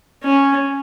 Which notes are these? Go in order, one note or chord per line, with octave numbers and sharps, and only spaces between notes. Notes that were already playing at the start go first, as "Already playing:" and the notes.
C#4